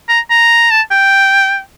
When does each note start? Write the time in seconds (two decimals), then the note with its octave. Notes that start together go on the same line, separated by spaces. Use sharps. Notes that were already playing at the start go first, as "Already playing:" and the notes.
0.09 A#5
0.30 A#5
0.71 A5
0.91 G5